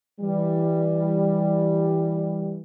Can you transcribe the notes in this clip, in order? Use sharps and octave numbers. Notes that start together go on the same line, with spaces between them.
E3 G3